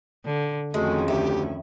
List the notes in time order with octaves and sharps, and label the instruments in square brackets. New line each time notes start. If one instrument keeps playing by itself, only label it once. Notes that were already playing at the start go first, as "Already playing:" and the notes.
[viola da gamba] D3
[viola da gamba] F2 D#3 C#4 [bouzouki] G#3 [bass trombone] A3 [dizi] F#4
[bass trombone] D2 [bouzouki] E4 [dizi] G4